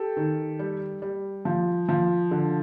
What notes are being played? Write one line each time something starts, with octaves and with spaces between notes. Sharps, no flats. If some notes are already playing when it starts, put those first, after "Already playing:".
Already playing: G4 A4
D#3
G3
G3
F3
F3
D3